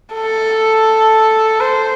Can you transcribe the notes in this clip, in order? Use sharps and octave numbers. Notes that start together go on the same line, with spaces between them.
A4
C5